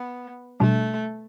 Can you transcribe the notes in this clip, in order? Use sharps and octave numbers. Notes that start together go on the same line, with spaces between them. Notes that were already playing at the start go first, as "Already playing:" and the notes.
Already playing: B3
B2 G3 A3 D4